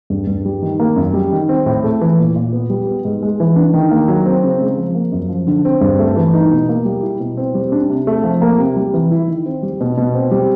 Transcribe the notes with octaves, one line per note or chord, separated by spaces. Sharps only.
G2
G2
G3
D#3
A#3
F#2
G3
D#3
C4
A2
A3
E3
A#2
A#2
B3
G3
B3
G#2
G#3
E3
D4
D#3
A#3
F#3
C4
C#3
G#3
F3
A#3
F#2
F3
D3
C4
G2
A3
E3
D#4
B2
A#3
G3
E4
B2
C4
G3
D4
C3
A3
F3
A#3
C3
G3
E3
E4
D#3
C4
G3
B2
B2
C4
G3